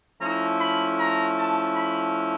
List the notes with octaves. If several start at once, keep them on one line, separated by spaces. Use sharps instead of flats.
F3 A3 C#4 E4 A#5
B5
A#5
A5
B5